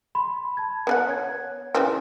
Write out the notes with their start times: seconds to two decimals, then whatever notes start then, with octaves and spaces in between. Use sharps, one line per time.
0.15 B5 C6
0.57 A5 G#6
0.87 B3 B4 F#5 G#5 F#6
1.08 C#5 G#6
1.75 C#3 E3 C4